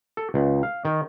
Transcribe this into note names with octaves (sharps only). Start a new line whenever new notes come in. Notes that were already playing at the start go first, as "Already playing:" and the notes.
A4
C#2
F5
D#3